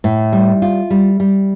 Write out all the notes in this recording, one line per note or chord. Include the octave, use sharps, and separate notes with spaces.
A2
G3
F4
G3
G3